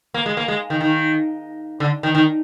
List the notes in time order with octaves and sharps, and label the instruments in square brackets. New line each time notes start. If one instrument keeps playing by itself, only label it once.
[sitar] A#3
G#3
A#3
G#3
D#3
D#3
D3
D#3
D#3